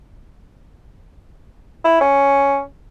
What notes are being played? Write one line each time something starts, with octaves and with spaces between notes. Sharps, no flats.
E4
C#4